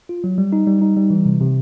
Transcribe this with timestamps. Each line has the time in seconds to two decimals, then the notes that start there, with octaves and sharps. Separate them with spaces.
0.09 F4
0.24 F#3
0.38 G3
0.52 D#4
0.67 G3
0.82 D#4
0.97 G3
1.10 E3
1.25 C3
1.41 C3